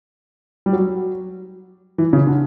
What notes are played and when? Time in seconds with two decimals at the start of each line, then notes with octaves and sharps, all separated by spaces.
0.66 G3
0.73 F#3
1.98 E3
2.13 C#3
2.27 D3